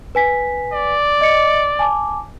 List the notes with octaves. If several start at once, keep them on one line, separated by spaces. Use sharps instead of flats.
B4 G#5 B6
D5
D#5 C#7
G#5 A5 D6